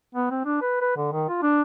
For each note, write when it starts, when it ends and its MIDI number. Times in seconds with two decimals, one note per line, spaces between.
0.15 0.30 59
0.31 0.40 60
0.45 0.61 62
0.61 0.80 71
0.81 0.93 71
0.97 1.12 50
1.13 1.24 51
1.29 1.38 65
1.42 1.62 62